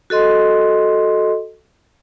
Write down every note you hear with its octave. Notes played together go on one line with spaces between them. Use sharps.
F#4 A4 D#5 C6